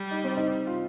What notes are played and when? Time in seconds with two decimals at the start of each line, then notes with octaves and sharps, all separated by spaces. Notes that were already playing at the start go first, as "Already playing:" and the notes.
Already playing: G3
0.11 D#4
0.24 C4
0.37 D#4
0.67 F4